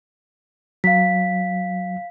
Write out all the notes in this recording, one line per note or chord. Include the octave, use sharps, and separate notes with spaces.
F#3 F5 B6